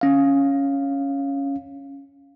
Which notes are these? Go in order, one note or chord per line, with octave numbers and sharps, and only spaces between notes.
C#4 F5